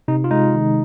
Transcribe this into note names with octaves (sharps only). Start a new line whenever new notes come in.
C3 D#4
F4
G#3 D#4
D#3